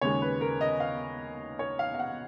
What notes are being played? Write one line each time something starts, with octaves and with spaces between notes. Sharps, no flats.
D#2 C#3 G#3 C#5
B4
A#4
D#5
F5
C#5
F5
F5
F#5